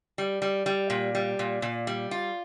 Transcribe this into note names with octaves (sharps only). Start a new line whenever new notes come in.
G3
G3
G3
A#2
G3
A#2
A#2
G3
F4